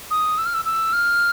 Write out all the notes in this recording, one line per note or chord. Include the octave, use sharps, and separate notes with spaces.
D#6
E6
F6
E6
E6
F6